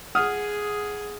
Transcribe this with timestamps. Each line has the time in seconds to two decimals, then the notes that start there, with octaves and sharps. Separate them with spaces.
0.15 G#4 F#5 D#6 F6